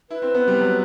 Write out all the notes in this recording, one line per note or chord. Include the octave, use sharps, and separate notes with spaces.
E4 B4
C4
B3
G3
F#3